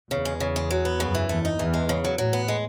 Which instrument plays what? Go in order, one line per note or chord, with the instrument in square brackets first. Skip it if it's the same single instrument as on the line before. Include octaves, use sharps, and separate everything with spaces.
[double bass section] E2 [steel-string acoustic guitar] C#3
[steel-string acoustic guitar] G#3
C#3
G#3
F#3
B3
[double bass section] F#2 [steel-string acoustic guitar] C#3
[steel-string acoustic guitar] E3
[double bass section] E2 [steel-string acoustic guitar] A3
[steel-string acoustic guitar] D#4
[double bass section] E2 [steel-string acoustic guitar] E3
[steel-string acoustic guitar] G#3
C#3
F#3
[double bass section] A2 [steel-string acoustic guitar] F#3
[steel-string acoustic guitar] B3
G#3